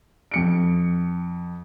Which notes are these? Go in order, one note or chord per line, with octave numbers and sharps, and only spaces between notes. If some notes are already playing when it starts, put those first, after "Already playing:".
F2 C#7 D7